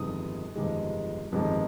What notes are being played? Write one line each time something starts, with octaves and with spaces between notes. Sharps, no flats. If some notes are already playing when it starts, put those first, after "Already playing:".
Already playing: G1 F2 C3 D#3 G#3 D#6
G1 F2 C3 D#3 G#3
G1 F2 C3 D#3 G#3